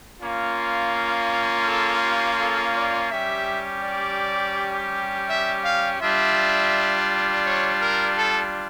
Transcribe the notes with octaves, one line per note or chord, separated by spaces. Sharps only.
A#3 C#4 F4
A4
G4
A4
D5
G3 C#4 G4 E5
D5
E5
F5
G3 D4 F4 E5
C#5
A#4
A4